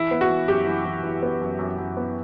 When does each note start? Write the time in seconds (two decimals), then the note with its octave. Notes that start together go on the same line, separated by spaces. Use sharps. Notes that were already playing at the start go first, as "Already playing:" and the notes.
Already playing: E3 E4
0.11 B3
0.21 F#4
0.30 E3
0.48 F#2 G4
0.67 E3
0.85 E3
1.03 E3
1.22 B3
1.41 F#2
1.59 F#2
1.78 F#2
1.97 B3